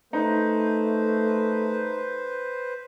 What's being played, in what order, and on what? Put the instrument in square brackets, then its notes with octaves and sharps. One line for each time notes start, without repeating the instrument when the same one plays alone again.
[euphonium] A3 [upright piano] D#4 [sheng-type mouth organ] B4 C5